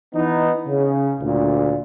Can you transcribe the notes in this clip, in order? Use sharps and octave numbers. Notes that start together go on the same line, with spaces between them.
E3 B3 D#4
C#3
D2 A#2